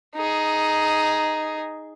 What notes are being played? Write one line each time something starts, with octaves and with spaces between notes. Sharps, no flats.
D#4 G#4